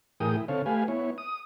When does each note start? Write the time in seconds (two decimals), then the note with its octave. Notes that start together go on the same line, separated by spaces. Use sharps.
0.20 A2 E3 G#4 A#4 G5 D#6
0.37 E4
0.48 D3 C4 A4 C#5 F5
0.66 A3 G4 B4 F5 G#5
0.88 B3 E4 C#5
1.18 D#6